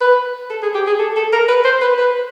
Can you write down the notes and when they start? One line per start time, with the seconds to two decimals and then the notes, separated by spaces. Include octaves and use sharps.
0.01 B4
0.50 A4
0.63 G#4
0.75 G4
0.87 G#4
1.00 A4
1.17 A4
1.33 A#4
1.49 B4
1.65 C5
1.81 B4
1.98 B4